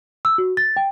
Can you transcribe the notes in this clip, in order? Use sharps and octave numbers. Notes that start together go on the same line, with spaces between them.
E6
F#4
A6
G5